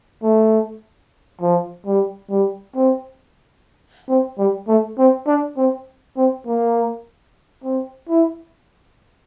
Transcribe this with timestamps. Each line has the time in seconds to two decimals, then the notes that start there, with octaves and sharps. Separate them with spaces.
0.23 A3
1.41 F3
1.86 G3
2.30 G3
2.76 C4
4.09 C4
4.38 G3
4.68 A3
4.98 C4
5.27 D4
5.57 C4
6.17 C4
6.47 A#3
7.64 C4
8.09 E4